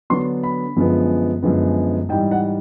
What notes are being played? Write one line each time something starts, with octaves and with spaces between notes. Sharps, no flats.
D3 F#3 B3 D4 C6
B5
F#2 D3 F3 G#3 B3
F#2 D3 F3 G#3 B3
G#2 E3 G3 G5
F#5